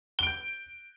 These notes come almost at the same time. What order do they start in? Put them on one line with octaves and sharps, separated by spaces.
G7 D7 G6